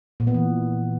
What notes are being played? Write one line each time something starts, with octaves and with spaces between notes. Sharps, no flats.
A#2
B3
E3